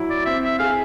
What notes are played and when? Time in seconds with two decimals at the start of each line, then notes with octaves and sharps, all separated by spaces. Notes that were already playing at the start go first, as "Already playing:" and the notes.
Already playing: F#3 E4
0.10 D5
0.26 C4 E5
0.43 E5
0.59 G#4 F5